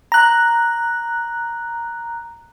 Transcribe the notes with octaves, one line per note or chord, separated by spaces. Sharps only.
A#5 F#6